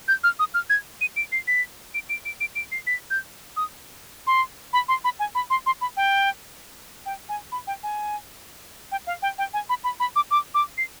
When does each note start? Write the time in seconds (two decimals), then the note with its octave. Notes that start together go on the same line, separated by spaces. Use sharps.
0.08 G6
0.24 F6
0.39 D#6
0.54 F6
0.70 G#6
1.01 D#7
1.16 D7
1.32 C7
1.47 B6
1.94 D7
2.09 D7
2.25 D7
2.41 D7
2.55 D7
2.72 C7
2.87 B6
3.10 G6
3.57 D#6
4.27 C6
4.73 B5
4.88 C6
5.04 B5
5.19 G#5
5.35 B5
5.50 C6
5.66 C6
5.81 B5
5.97 G5
7.06 G5
7.29 G#5
7.52 B5
7.67 G5
7.83 G#5
8.92 G5
9.07 F5
9.22 G5
9.38 G5
9.53 G#5
9.69 B5
9.84 B5
10.00 B5
10.16 D6
10.31 D6
10.54 D6
10.78 C7